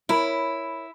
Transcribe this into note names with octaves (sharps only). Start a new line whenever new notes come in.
E4 A#4 C#5 B5